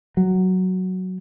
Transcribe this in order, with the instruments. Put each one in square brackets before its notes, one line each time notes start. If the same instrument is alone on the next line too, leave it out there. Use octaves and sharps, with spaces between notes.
[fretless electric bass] F#3